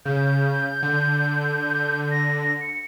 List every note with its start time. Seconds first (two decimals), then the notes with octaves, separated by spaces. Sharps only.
0.05 C#3 G6
0.82 D3
2.11 A#6
2.61 C#7